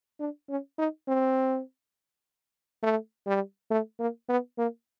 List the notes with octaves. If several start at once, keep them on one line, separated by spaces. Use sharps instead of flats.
D4
C#4
D#4
C4
A3
G3
A3
A#3
B3
A#3